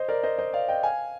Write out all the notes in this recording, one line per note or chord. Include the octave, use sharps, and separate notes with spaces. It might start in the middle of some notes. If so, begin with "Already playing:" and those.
Already playing: C5 D#5
A#4 D5
C5 D#5
C5 D#5
D5 F5
D#5 G5
F5 G#5